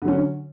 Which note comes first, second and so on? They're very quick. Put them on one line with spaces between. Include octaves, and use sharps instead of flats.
D3 F#3 C#4